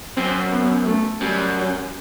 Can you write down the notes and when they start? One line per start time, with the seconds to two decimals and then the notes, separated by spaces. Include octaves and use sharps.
0.17 F#2 C4
0.52 B3
0.86 A3
1.21 F#2 G3